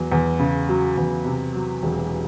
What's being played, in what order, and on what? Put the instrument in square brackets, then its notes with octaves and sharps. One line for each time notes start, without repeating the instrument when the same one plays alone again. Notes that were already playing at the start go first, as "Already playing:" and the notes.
Already playing: [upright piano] E2 F#3
E2
C#3
F#3
E2
C3
F#3
E1